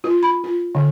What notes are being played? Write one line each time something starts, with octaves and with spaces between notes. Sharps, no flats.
F4
B5
F4
D3